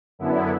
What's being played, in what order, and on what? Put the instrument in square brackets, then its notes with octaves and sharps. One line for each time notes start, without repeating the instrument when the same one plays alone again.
[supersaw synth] F#2 D3 B3 E4